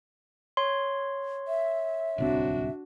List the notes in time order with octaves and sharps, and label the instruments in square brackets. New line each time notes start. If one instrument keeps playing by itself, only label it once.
[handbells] C#5 C6
[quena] E5
[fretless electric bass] D1 C2 C4 [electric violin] D4 F#4